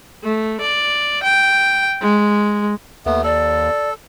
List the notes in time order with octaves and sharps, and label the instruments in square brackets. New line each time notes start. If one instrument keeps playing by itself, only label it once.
[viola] A3
D5
G5
G#3
[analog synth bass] D#2 [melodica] A3 B3
[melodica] A4 [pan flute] D5